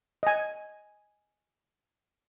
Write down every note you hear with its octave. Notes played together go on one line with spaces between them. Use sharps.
D#5 G#5